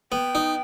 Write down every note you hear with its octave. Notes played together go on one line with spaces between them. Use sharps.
B3 G5
D#4